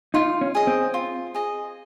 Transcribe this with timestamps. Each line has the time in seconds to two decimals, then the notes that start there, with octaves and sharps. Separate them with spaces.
0.14 D#4 F4
0.41 C#4
0.55 G#4 D#5
0.67 C4
0.94 F4
1.34 G#4 D#5